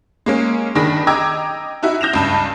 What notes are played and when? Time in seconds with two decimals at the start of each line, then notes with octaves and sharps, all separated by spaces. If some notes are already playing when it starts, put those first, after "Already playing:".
0.26 G#3 A#3 C#4
0.75 G1 D#3 D4 G#4 B5 A#6
1.07 D#5 G5 A#5 D6 E6 G#6
1.83 D#4 E4 F#4 E5
2.01 G6 A#6 E7 F7
2.13 C#2 G2 E7